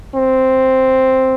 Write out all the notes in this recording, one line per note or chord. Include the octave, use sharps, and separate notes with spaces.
C4